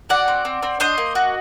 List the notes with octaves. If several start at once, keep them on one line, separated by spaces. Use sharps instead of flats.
F#4 D5 F#5
C4
C4
C4
D4 C5 D#5
A#3
F#4